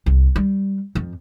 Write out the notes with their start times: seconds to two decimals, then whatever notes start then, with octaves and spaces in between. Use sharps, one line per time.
0.06 C2
0.36 G3
0.95 F2